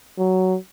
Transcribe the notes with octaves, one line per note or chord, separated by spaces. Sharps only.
F#3